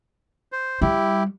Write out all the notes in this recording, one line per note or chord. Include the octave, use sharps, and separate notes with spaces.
C5
G3 E4 G4